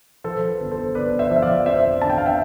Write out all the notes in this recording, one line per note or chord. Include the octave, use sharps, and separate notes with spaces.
F3 A4 C5
B4
G1
A4 C5
G1 B4 D5
C5 E5
F3
E5
D5 F5
F2 C5 E5
D3 A5
G5
F5
E5 G5